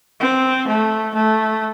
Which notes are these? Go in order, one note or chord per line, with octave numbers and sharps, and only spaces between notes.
C4
A3
A3